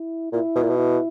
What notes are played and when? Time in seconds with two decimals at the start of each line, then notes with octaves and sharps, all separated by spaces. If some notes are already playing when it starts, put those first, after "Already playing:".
Already playing: E4
0.33 A#2 E4
0.55 B2
0.62 A#2
0.69 B2
0.77 E4